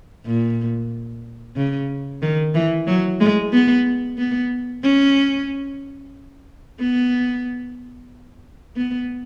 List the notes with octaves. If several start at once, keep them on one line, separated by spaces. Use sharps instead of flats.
A#2
C#3
D#3
E3
F#3
G#3
B3
B3
C#4
B3
B3